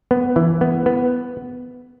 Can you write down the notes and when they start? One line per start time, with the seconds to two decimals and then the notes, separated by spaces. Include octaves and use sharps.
0.11 B3
0.36 E3
0.61 B3
0.86 B3